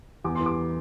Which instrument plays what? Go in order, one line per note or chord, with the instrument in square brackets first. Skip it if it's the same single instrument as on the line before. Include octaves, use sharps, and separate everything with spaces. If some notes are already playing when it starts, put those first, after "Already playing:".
[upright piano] E2 D6
E3 C6
D6